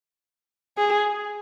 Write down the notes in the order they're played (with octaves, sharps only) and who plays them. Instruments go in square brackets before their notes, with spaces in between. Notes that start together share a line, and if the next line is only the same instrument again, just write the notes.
[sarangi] G#4